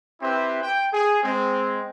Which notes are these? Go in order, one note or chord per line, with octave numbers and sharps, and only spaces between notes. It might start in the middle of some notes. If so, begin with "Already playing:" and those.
C4 E4 G4 B4 C5 E5
G5
G#4
G#3 C4